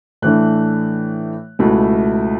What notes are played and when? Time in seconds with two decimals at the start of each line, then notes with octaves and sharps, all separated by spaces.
0.22 A2 E3 A3 D4 F#6
1.59 C#2 B2 A3 E4